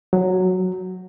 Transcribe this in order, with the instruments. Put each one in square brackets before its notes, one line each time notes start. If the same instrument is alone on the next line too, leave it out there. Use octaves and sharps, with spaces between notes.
[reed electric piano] F#3